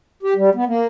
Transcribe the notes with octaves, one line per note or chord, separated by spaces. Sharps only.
G4
G3
B3
A#3